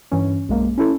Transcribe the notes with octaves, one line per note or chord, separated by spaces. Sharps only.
G2 E3 C#4
B1 G#3 A#3
C#4 E4 A4